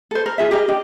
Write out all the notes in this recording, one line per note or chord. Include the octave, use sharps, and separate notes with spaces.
A4 C5
A#4
F4 G#4 E5
G4 G#4 A#4 D#5
D4 G4 D#5